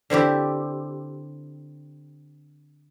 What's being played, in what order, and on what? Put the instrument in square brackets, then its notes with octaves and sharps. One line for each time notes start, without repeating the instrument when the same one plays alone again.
[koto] D3 C4 E4 G4